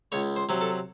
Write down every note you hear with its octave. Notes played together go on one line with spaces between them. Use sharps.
C#2 C#5
C5
C3 F#3
A4